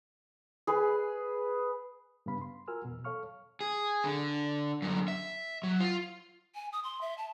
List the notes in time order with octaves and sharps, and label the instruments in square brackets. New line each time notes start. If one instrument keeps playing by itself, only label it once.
[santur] G#4 B4
[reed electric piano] G2 C#3 B3 F5 B5
C6
F4 F#4 A#4 G#5 E6 F6
E2 B2
A4 C#5 F5 C#6 F6
[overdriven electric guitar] G#4
D3
F#2 D3
E5
F#3
F4
[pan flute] G#5
D#6
C6
E5
A5